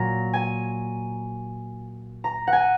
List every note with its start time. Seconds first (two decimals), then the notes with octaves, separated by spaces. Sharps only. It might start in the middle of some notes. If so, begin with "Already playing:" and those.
Already playing: A#2 F#3 A#5
0.33 G#5
2.24 A#5
2.47 F#5
2.53 G#5